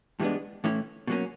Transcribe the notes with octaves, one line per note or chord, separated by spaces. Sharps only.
G2 E3 G#3 B3 D4
A2 E3 A3 C#4 E4
B2 F#3 A#3 C#4